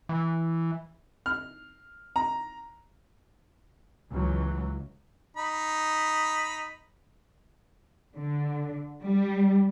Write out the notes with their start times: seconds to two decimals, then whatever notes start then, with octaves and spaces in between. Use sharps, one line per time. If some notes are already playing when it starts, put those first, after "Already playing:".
0.09 E3
1.26 F6
2.16 A#5
4.10 C#2 E3 F#3
5.37 D#4 B5
8.16 D3
9.05 G3